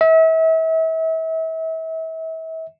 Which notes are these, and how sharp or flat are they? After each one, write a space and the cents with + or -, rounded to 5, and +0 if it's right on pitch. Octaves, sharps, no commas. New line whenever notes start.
E5 -35